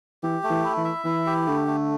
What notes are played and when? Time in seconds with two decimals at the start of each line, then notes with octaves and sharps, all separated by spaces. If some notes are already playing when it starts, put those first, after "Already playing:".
0.23 E3 G4
0.44 A3
0.50 E3
0.64 E4
0.77 E3
0.84 E5
1.05 E3 E4
1.27 G4
1.47 D3 A3
1.68 A3